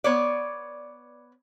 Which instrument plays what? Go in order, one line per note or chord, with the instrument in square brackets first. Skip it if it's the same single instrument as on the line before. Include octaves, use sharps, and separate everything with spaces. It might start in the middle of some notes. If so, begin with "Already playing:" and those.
[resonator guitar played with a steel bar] B3 C#5 D5